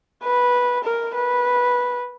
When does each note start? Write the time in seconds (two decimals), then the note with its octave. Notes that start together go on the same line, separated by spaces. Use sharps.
0.23 B4
0.84 A#4
1.14 B4